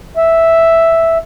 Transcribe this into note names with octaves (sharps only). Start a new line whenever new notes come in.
E5